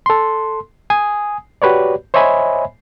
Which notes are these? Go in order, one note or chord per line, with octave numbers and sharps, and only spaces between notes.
A4 C6
G#5 D#6
F#4 G4 B4 C#5 D5
C5 C#5 D#5 E5 G#5 B5